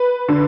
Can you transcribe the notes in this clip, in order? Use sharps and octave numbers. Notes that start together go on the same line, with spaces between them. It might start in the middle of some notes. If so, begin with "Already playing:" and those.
Already playing: B4
D3